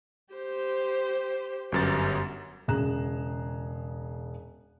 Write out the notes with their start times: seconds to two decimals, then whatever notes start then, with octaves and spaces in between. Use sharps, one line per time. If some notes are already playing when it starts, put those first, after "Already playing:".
0.34 G4 C5
1.72 G1 F#2 G4 A#4 A6
2.68 E1 C#3 G#4 A#5 F#6 E7